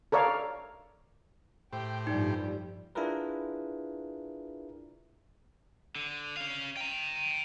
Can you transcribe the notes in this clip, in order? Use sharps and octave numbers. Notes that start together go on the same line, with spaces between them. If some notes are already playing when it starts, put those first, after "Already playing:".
A4 A#4 C#5 D5 F5
A2 G4 C5 G5
G2 F3 G3 D#4
D4 E4 F4 G#4 A#4 B4
D3
C#4 F5
G5 A#5